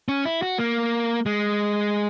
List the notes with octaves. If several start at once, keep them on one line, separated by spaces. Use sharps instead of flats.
C#4
E4
F#4
A#3
G#3